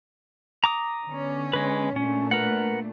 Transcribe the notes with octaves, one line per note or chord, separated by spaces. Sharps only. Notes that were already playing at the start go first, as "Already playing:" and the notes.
A#5 D6 D#6
D3 B3 C#4
G#3 B4
A#2 A3 C#4 D4
A#4 B4 F#5